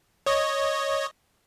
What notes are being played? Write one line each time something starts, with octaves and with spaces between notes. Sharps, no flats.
C#5 D#5